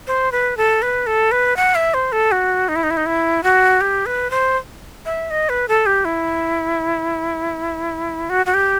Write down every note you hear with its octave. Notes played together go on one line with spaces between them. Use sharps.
C5
B4
A4
B4
A4
B4
F#5
E5
C5
A4
F#4
D#4
E4
D#4
E4
D#4
E4
F#4
G4
B4
C5
E5
D#5
B4
A4
G4
E4
F#4
F#4
G4